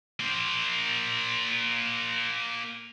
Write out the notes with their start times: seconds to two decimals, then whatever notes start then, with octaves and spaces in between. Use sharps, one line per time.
0.20 A#3 C5